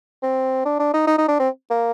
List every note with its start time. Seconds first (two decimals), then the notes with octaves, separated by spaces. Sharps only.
0.23 C4
0.65 D4
0.80 D4
0.94 D#4
1.07 D#4
1.18 D#4
1.28 D4
1.39 C4
1.70 A#3